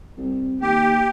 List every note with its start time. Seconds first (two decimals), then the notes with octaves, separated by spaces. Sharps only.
0.17 C2
0.61 D#2 G4